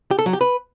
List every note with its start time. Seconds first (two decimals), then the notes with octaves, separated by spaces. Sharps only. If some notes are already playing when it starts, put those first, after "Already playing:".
0.11 G4
0.19 A4
0.26 F#3
0.33 G4
0.41 B4